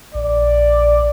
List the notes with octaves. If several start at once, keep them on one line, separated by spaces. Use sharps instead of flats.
A#1 D5